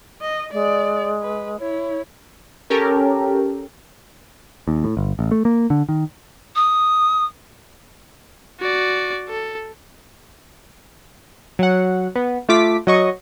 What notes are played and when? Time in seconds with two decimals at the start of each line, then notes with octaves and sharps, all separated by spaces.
0.21 D#5
0.52 G#3 D5
1.21 B4
1.59 E4 C#5
2.70 C#4 G4 A4 A#4
4.68 D#2
4.84 A2
4.97 G1
5.19 A1
5.31 A3
5.45 A#3
5.70 D3
5.89 D#3
6.55 D#6
8.60 F#4 D5
9.29 A4
11.59 F#3 F#5
12.15 B3
12.49 A3 F4 D6 B6
12.87 F#3 D#5 C#6